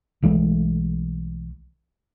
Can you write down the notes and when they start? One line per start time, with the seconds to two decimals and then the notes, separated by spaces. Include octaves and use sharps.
0.22 B1 E3 G#3 A3